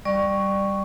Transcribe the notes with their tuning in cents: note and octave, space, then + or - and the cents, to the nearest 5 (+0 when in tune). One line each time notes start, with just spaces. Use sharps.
G3 +0 D5 +20 C#6 +0